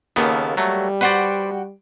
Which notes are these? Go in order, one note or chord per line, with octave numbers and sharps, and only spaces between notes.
D#2 C#3 A#3 B3 A4
F#3 G3 A3
F#4 B4 C5 D5 F#5 G5